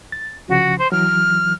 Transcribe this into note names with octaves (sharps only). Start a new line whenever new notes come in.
A6
C2 C#3 F3 F#4
C5
E3 F#3 F6